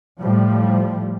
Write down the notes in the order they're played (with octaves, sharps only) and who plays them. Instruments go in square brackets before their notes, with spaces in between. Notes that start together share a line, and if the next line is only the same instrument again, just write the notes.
[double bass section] A2 F3 G3